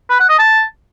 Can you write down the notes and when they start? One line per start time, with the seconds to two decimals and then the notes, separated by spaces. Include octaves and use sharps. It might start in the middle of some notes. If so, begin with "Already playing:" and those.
0.10 B4
0.20 F#5
0.29 D#5
0.39 A5